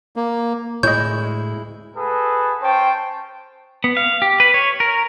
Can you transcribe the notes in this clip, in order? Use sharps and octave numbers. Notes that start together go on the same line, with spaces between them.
A#3
D2 A2 G#3 E4 C#5 D#5 G6
F#4 G#4 A4 B4
C#4 C5 C#5 G5 A5
B3
F5
G4
B4
C#5
A#4